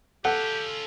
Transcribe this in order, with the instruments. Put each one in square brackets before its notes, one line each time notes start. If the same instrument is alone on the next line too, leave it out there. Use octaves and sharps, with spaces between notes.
[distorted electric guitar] C#4 F4 [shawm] G4 [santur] A4 [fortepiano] F#5